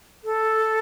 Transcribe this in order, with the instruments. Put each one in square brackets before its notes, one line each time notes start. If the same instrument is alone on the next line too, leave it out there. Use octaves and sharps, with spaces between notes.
[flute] A4